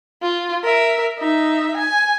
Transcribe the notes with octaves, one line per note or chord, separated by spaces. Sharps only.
F4
A#4 E5
D#4 E5
G#5